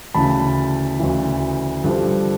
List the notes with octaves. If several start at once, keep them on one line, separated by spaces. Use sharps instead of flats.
D2 C#3 E3 A5 B5
D2 C#3 E3
G2 D3 F3